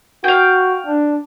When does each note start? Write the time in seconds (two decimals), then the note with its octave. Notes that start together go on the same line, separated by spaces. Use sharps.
0.24 F#4 F5 G5
0.86 D4